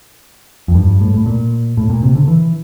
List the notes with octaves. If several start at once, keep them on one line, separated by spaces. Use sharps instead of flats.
F2
G2
A2
A2
A#2
A2
A#2
C3
D3
E3